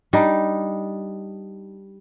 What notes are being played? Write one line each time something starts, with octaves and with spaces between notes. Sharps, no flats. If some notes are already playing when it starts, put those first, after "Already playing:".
G3 D4 D#4